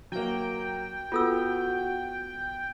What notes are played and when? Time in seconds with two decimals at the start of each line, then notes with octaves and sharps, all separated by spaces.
0.12 F#3 A#3 G5
1.12 B3 F4 F#4 A4 E6